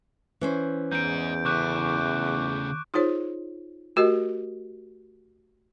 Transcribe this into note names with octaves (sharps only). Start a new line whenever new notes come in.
E3 C#4 C5
E2 D#4 G#4 G6 D7
C#3 A3 C#6 D6 F#6
D#4 F4 G#4 C5 C#5
A3 F#4 G4 A#4 D#5